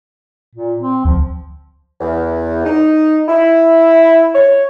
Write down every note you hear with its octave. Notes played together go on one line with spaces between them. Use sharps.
A#2
C4
D2 F3
E2
D#4
E4
C#5